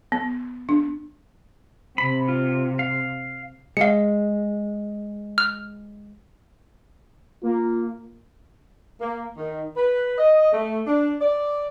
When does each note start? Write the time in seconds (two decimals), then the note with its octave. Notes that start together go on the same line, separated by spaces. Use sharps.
0.12 B3
0.69 D4
1.98 C3 B5
2.28 F4
2.79 F5
3.77 G#3 F5 C#7
5.38 F6
7.43 A#3 F4
9.01 A#3
9.37 D#3
9.77 B4
10.18 D#5
10.52 A3
10.86 D4
11.21 D5